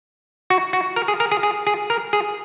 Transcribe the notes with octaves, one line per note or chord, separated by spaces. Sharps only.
F#4
F#4
A#4
G#4
A#4
G#4
G#4
G#4
A#4
G#4